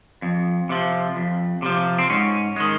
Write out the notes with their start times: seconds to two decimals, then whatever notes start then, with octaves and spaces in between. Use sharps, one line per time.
0.22 F2
0.69 C3 F3
1.16 F2
1.62 C3 F3
1.98 C4
2.10 G#2 C#4
2.56 D#3 G#3